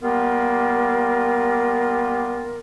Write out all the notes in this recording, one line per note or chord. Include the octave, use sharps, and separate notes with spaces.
G3 A#3 B3 F4 A#4